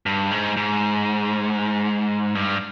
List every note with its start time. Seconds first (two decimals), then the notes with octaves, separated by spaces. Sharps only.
0.06 G2
0.31 G#2
0.57 G#2
2.35 G2